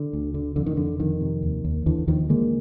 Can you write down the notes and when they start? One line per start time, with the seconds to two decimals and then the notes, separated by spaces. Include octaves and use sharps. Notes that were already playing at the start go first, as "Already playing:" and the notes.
Already playing: D3
0.13 D2
0.34 D3
0.56 F2 D3
0.66 D#3
0.77 F2 D3
1.00 F2 D#3
1.21 C3
1.42 D#2
1.65 D#2
1.86 D#2 D3 E3
2.07 D#2 D#3 F3
2.29 D3 G#3 A#3